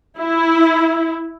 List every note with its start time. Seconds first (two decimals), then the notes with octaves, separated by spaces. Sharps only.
0.19 E4